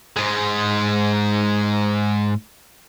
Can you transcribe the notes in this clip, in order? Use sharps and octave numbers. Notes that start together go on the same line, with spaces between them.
G#2 G#3